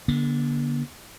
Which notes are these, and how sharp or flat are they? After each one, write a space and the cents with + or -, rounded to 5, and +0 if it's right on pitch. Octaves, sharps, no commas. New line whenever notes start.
D3 -20 A#3 +45